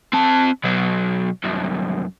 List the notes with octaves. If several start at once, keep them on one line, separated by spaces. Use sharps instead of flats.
C4 A5
B2 F#3
C2 F#2